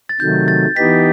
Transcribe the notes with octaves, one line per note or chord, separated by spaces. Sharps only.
A6
C3 D#3 F#3 A3 G6
A6
E3 B3 D#4 G4 B6